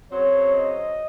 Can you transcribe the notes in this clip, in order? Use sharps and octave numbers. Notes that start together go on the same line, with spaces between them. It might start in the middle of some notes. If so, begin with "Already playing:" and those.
C#3 F#3 C4 C#5
D#5